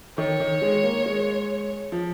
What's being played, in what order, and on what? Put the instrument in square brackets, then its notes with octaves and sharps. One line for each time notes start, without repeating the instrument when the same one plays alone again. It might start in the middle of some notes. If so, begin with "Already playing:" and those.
[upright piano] D#3 [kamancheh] C#5
[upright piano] D#3
G#3
A#3
G#3
F3